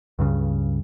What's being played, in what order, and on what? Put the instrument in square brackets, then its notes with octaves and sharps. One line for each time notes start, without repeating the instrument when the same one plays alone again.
[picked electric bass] C#2 G2 C#3